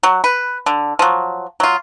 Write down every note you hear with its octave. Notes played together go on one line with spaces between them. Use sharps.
F#3
B4
D3
F3 F#3
F#3 F4